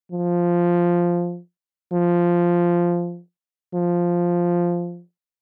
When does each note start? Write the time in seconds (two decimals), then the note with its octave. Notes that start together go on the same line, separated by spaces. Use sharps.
0.12 F3
1.93 F3
3.75 F3